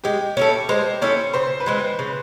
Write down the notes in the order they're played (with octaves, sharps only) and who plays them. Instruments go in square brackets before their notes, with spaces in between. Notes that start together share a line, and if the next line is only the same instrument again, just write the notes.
[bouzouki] G#3 [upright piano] G4
[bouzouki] C#4 E4 A4
[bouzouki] G#3 [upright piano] C5
[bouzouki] C#4 E4 A4 [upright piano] C#5
[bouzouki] C#3 [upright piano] C5
[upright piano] B4
[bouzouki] E3 G#3 C4 [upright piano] C5
[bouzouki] C#3 [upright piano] B4